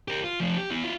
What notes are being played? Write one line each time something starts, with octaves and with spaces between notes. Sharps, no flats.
G4 A#4
F4
F3 A3
G4
B3 E4
E4 F4